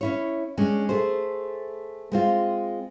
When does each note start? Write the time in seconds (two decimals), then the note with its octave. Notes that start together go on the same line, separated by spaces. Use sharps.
0.01 C#4 E4 C#5
0.57 G#3 C#4 D4
0.89 A3 G#4 C5
2.12 G#3 C4 F4